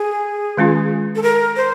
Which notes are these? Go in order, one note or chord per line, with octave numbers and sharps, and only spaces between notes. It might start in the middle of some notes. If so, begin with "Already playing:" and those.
Already playing: G#4
D#3 G#3 C#4 F4
A4
A#4
C5